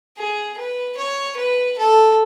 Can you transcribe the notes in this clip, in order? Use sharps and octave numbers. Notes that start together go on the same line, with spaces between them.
G#4
B4
C#5
B4
A4